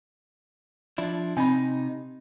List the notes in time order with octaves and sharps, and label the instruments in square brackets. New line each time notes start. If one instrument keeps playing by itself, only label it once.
[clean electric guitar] F3 D4 E4
[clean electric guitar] C3 D#4 [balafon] C4 B5